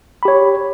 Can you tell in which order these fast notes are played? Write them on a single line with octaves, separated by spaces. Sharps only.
B5 G4 C#5